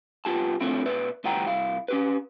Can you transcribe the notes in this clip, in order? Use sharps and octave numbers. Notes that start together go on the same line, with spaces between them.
C2 B3 F4 G4 A5
D3 D#3 F3 A3 C4 E4
B2 B4 D5 E5
D2 E3 G3 F#5 G5 A#5
C2 E4 F5
C#4 G4 B4